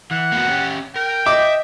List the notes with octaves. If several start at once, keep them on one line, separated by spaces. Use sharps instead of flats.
E3 F#5
A#3 B3 F#4
C#4 G4
A#4 G5
D#5 E5 D6